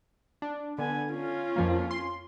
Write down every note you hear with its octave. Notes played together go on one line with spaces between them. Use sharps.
D4
D3 B3 G#5
C#4 F4
F2 F3 A#3
C6